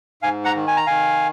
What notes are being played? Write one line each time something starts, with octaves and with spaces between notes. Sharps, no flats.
G#2 F5 G#5
F#5 A#5
D#3
G#5
A#5
D#3 F5 G#5